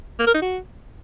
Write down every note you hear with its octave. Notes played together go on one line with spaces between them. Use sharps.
A#3
A#4
D#4
F#4